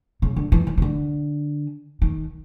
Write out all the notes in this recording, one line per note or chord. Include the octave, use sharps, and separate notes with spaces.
C#3
D3
E3
D#3
D#3
D3
D#3